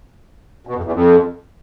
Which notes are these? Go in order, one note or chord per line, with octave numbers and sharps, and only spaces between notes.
B2
F2
E2
F2